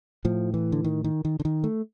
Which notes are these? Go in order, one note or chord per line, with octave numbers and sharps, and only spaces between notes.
A2 F3
E3
D3
D#3
D#3
D#3
D3
D#3
A3